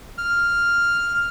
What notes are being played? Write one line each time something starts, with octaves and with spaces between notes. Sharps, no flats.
F6